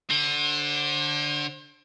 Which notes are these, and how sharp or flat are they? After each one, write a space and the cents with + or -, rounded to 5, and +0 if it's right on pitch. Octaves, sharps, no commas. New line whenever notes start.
D3 +0 C5 +35